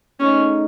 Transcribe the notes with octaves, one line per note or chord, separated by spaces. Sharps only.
A3 C#4 D#4 G#4 D#5